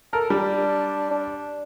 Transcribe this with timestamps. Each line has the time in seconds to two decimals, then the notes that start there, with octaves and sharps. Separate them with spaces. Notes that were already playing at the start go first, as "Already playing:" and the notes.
0.13 A4 A#4
0.30 G3 D4
1.11 D4